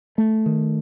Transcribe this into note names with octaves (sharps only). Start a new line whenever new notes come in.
A3
D#3